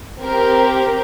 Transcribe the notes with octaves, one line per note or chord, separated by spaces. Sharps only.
C4 G4 A#4